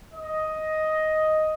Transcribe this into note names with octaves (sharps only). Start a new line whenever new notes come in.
D#5